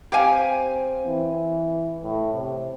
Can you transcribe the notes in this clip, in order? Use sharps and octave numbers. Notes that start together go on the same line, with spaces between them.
C4 G4 F5 G#5
E3
A2
C3